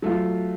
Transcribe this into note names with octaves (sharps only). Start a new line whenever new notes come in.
F#3 A3 F4